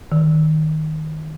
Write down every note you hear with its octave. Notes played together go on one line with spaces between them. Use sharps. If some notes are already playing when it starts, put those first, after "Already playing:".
D#3